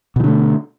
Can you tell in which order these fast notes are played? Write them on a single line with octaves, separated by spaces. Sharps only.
B2 E3 D3 A3